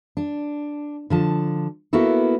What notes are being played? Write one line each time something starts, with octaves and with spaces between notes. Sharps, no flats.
D4
D3 F3 A5
A#3 B3 E4 F#4 A4